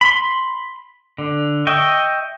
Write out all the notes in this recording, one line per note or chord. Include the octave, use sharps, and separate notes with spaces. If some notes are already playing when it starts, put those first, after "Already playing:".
B5 C6
D3
D#5 E5 G5 C#6